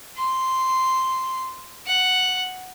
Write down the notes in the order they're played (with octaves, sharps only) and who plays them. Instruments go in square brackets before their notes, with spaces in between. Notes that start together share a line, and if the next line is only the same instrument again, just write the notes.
[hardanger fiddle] C6
F#5